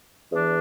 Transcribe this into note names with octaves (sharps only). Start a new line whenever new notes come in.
E2 E3 D4